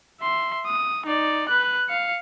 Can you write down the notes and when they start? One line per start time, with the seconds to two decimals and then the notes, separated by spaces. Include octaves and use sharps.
0.21 E5 C6
0.66 D#6
1.06 D#4 D5
1.49 B4 F#6
1.89 F5 C#7